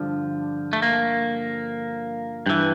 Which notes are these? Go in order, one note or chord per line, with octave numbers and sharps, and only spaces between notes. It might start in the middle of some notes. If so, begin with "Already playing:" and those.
Already playing: G2 D3 F3
A3
A#3
G2 E3